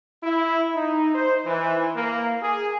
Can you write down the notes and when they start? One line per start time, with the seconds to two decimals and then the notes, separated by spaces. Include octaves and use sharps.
0.24 E4
0.75 D#4
1.15 C5
1.45 E3
1.96 A#3
2.43 G#4